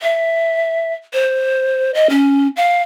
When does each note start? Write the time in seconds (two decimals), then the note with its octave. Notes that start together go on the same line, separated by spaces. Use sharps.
0.01 E5
1.14 C5
1.95 D#5
2.10 C#4
2.57 F5